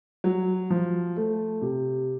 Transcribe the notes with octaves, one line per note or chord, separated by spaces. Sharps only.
F#3
F3
A3
C3